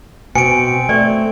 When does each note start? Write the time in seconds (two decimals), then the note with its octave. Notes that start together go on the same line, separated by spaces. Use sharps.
0.35 B2 C4 G#5 C#7 D7
0.89 A3 D5